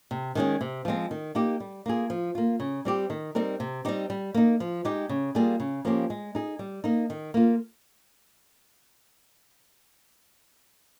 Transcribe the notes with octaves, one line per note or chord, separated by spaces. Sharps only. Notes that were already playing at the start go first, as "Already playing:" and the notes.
C3
D#3 G#3 C#4 G#4
C3
F3 G#3 C4
D#3
A#3 D#4 G4
G3
A#3 F4 G#4
F3
A#3 F4
C#3
G3 C4 G4
D#3
G3 C4 D#4 A#4
C3
G3 C4 D#4 G4
G3
A#3 D#4
F3
G#3 D#4 G4
C#3
G3 A#3 F4 G#4
C#3
F3 A#3 C#4 G4
G#3
D#4 G#4
G3
A#3 D#4
D#3
A#3 F4